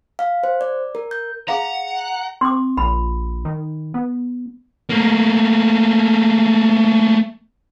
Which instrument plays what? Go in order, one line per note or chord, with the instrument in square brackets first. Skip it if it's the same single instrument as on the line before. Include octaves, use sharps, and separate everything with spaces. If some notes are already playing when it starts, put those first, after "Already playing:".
[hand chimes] F5
C5
D5
A#4
G6
[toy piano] G#4 F5 [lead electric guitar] F#5 [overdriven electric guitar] A#5
[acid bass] C4 [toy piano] C6 D6
[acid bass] A#1 [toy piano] B5
[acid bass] D#3
B3
[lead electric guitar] A3 A#3